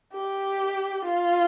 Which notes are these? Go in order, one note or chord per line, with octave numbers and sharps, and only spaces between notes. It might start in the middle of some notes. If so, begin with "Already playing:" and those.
G4
F4